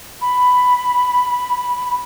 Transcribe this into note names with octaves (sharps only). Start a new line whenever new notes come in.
B5